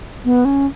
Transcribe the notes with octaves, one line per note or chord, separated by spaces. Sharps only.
B3
C#4